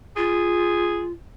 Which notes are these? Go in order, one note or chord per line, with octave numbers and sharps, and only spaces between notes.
F4 G#4